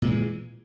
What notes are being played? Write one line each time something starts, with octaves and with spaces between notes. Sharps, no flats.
A#2 E3 G#3